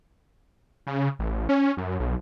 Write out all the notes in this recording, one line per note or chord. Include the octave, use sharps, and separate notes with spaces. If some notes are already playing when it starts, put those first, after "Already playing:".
C#3
A1
C#4
F#2
B1